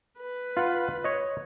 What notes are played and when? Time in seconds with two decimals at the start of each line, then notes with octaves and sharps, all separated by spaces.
0.20 B4
0.57 F4 F#5
1.04 C#5 D#5